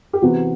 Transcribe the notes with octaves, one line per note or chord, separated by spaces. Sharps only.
G4
E2 C3 E3 B3 F#4